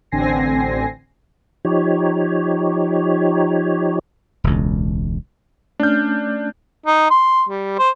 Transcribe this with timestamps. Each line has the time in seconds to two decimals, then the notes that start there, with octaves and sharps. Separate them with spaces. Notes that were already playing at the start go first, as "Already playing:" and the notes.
0.11 A1 D3 C4 G#5 A#6 C7
1.65 F3 D#4 G4 C#5
4.44 E1 C#2
5.80 A3 C#4 D4 F6 G6
6.86 D#4
7.10 C6
7.49 G3
7.79 C5